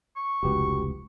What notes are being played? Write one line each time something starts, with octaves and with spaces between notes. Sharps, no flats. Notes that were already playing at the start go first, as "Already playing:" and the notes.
C#6
F1 C#2 F#4 G4 B4